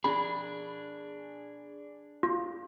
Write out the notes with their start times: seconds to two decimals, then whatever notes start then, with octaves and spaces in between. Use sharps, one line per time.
0.04 D4 G#4 B5
2.23 F4